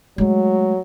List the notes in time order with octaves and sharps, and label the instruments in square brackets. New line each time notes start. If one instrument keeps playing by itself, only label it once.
[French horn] F#3 [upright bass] G#3 A3